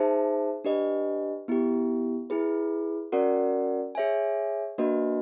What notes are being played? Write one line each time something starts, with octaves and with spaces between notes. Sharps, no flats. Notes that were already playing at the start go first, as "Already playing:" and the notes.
Already playing: D#4 G#4 C5 E5 A5
D4 G4 B4 D#5
B3 E4 G4
E4 G#4 B4
C#4 F#4 A#4 D5 F#5
G#4 C#5 E5 G#5
A#3 D4 F#4 B4 D#5